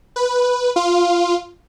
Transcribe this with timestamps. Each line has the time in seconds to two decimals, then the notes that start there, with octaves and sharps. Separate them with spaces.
0.16 B4
0.76 F4